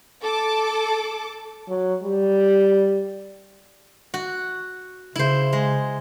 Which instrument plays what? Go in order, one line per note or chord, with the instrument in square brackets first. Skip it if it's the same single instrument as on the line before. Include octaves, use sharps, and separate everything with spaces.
[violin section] A4 A5 D6
[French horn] F#3
G3
[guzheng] F#4
[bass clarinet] C#3 [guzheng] E4 C5
[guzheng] G#3